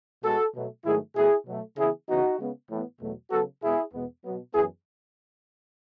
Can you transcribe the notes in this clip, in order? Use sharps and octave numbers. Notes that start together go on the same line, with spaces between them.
B2 G#3 B3 F#4 A4
B2 F#3 A3
G#2 D#3 F#3 A3 E4 G#4
B2 A3 E4 G#4
B2 F#3 A3
C#3 E3 B3 E4 G#4
C#3 E3 B3 D#4 F#4
C#3 G#3 B3
A2 E3 B3
E2 B2 F#3 A3
C#3 F#3 B3 F#4 A4
B2 G#3 B3 E4 G#4
E2 B2 G#3 B3
B2 F#3 B3
F#2 E3 B3 E4 G#4